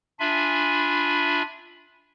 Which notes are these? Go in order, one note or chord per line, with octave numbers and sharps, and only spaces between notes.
D4 F4 E5 G#5 B5